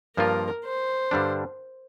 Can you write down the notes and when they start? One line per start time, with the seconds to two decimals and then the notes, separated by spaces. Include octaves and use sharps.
0.17 G2 F3 A#3 F4 A#4
0.65 C5
1.11 G2 D3 G3 D4